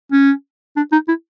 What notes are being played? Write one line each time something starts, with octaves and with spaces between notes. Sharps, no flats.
C#4
D4
D#4
E4